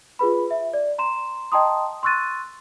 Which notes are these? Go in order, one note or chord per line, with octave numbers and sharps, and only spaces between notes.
F4 G#4 B4 B5
E5
D5
A#5 C6 E7
D#5 G5 A5 A#5 C6 D#6
C6 C#6 E6 F#6 A6 D#7